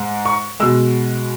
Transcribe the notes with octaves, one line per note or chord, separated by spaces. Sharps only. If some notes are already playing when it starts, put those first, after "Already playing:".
Already playing: G#2 G#3
C#6
B2 G#3 E6